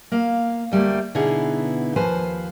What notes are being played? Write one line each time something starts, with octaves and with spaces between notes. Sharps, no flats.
A#3 F5
D2 G3 A3 A#3
B2 D3 B3 D#4 E4 G#4
D#2 F3 B4 C5 G#5